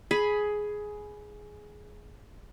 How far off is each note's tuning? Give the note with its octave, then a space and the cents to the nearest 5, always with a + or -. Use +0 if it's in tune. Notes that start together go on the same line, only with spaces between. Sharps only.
G#4 +10 B5 +0